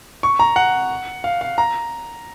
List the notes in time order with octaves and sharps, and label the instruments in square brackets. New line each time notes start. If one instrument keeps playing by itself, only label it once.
[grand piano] C#6
A#5
F#5
F5
F5
A#5